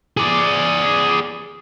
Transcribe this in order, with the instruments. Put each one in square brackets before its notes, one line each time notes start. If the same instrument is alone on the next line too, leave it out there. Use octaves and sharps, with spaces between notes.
[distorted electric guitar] G#4 D5